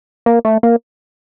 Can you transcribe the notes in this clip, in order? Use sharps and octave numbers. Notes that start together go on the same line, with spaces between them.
A#3
A3
A#3